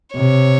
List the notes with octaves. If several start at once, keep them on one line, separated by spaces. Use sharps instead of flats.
C3 C#5